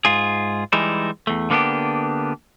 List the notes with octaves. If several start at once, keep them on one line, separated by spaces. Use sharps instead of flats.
G#2 F4 G#4
E3 G3 G#3 D#4 E4
E2 A3
D3 A#3 B3 D4 G4